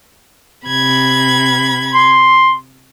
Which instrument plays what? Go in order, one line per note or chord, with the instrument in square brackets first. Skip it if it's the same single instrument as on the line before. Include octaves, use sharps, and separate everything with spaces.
[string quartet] C3 B5 G#6
[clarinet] C6